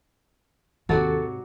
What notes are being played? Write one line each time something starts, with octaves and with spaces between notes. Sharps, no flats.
D#2 G#2 C3 F#3 F#4 A4 D5 A6